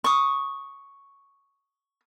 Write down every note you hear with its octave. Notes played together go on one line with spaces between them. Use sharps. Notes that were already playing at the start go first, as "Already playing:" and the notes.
C#6 D#6